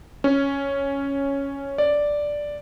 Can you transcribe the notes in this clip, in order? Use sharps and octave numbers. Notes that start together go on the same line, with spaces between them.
C#4
D5